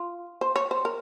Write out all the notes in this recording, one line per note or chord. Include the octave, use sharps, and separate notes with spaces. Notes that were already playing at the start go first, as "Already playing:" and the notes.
Already playing: F4
C5
C#5
C5
A#4